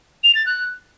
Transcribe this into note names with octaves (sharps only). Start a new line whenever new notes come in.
F7
A6
F#6